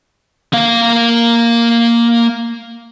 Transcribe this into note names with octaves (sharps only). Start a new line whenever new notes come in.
A#3 F5